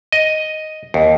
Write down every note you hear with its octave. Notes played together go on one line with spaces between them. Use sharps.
D#5
D#2